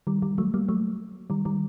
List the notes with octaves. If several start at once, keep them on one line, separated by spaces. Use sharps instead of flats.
D#3 G3
D#3 G3
F#3 A3
G3 A#3
F#3 A3
D#3 G3
D#3 G3